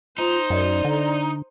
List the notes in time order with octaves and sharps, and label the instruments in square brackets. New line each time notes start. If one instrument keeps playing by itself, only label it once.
[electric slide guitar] D#4 [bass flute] F4 [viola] C5
[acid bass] F#2 [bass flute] D5
[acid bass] D3